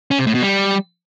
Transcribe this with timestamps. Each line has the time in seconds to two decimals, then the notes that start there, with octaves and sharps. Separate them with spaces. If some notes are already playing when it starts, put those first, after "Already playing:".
0.11 C#4
0.19 C3
0.26 A2
0.34 B2
0.42 G3